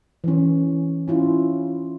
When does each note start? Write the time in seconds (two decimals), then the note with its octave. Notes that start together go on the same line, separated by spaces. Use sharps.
0.24 E3 C#4
1.08 C#4 E4 F4